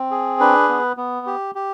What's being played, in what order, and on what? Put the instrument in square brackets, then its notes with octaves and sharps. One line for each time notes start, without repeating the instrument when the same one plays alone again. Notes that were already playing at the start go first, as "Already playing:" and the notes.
Already playing: [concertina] C4
G#4
D4 B4
B3
B3
G4
G4